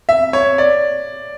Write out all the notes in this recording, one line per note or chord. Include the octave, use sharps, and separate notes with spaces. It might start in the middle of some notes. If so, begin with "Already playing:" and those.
E5
C#5
D5